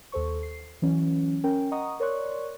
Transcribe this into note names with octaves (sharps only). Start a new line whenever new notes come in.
D#2 A4 C5 C#6
C7
E3 F#3 C#4
C#4 A#4 G5
D#5 F#5 A#5 C#6 D#6
A#4 C#5 D5 C6 C#6 F#6